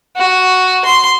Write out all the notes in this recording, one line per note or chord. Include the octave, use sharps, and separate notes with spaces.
F#4
C6